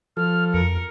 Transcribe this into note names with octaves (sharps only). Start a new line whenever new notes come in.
F3 A4 F6
F2 A#4 C#7